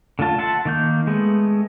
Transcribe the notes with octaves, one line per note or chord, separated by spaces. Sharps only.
D3 A3 F4 A5
E5 F#5 A5 C6
D#3 A#3 G6
G#3 A3 B3